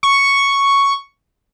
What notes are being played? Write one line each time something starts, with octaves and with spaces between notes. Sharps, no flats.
C#6